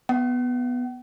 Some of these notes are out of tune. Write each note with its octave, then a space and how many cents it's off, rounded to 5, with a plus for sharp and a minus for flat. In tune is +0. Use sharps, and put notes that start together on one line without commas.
B3 +0 F#5 +45